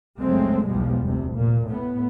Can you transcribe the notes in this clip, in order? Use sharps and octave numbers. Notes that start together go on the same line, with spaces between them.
G1 C#2 F#3 G#3 A3 C4
B1 E2 B2 F3 G3 G#3
F1 D2 C3
A#2
A2 B3